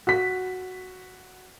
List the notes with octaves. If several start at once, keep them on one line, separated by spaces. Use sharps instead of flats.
F#4 B6